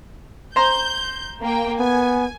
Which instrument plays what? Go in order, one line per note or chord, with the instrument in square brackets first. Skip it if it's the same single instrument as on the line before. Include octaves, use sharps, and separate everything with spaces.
[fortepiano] C5 A#5 C6 [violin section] G6
[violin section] A#3 G5
[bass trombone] B3 [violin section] G#5